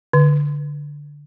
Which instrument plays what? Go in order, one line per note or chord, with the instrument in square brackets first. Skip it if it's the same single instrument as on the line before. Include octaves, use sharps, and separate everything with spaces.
[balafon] D3